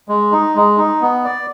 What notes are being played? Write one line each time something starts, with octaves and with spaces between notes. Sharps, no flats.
G#3
D#4
G#3
D#4
B3
D5